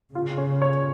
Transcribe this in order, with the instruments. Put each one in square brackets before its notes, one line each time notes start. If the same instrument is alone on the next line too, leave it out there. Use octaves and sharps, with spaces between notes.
[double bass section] C#3 [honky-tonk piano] F4
[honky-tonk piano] C#4
C#5